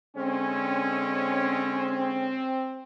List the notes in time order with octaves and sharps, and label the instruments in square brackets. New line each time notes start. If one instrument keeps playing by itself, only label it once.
[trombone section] D3 G#3 C#4 [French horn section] C4